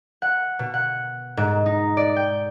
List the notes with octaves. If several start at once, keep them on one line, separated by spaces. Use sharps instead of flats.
F#5
B2
F#5
G#2
D#4
D5
G5